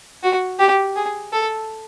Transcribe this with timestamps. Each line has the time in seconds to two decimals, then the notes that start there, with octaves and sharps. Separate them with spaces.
0.23 F#4
0.59 G4
0.96 G#4
1.32 A4